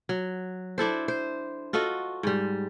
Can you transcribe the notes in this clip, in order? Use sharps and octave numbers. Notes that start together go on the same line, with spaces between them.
F#3
D4 E4 A4 C5
C5
F4 F#4 A4 D#5
G#2 G3